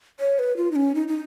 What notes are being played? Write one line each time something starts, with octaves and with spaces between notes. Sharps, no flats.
C#5
B4
F4
D#4
C#4
D#4
D#4